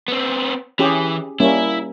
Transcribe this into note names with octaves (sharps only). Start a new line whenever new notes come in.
B3 C4
E3 C#4 G4 G#4
G3 A#3 C#4 E4